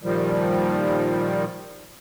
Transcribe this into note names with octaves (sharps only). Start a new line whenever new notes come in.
A#2 D#3 F3 G3